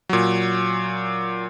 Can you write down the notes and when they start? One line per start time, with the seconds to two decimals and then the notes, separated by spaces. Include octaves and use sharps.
0.09 A#2 F#3